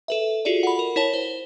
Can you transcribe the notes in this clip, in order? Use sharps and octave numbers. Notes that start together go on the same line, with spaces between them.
A4 B4 E5
F4 F#4 G#4 A4 D5
F#5 B5
A#4
E4 A#4 C#5 A5
C5